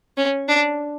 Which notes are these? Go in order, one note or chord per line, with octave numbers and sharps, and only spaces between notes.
C#4
D4